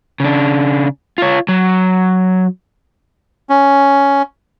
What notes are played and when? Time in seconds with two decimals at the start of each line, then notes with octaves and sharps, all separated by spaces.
0.20 C#3 D4
1.18 F4 C#5
1.48 F#3
3.50 C#4